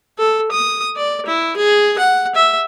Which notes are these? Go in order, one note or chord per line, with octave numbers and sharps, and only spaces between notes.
A4
D#6
D5
E4
G#4
F#5
E5